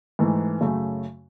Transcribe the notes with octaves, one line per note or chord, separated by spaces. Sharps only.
G#2 E3 A3
F#2 C#3 F#3 A3